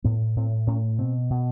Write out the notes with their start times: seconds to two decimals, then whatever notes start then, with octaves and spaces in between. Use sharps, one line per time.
0.04 A2 B3
0.36 A2 C4
0.67 A2 C#4
0.98 B2 C4
1.30 B2